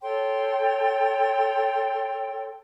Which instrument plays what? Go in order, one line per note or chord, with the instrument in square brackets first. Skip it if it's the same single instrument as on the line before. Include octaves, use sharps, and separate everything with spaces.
[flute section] A4 C#5 G5 C6